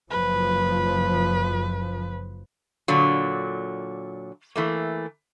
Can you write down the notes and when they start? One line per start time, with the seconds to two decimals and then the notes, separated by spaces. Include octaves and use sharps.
0.10 F#1 F3 B4
2.88 A#2 D3 F#3
4.56 E3 A3 A#3